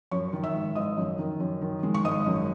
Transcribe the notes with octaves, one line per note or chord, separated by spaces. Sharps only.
F#2 C#5 C#6
D#3
E5 E6
G#1
G#1 D#5 D#6
F#2
D#3
F#2
D#3
G#3
C#6
G#1 D#5 D#6
F#2